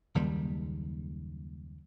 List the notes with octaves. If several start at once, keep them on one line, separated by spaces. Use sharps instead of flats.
F#1 D#2 G3